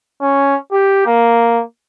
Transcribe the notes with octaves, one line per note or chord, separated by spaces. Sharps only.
C#4
G4
A#3